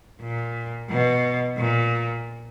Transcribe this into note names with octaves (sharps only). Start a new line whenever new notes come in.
A#2
B2
A#2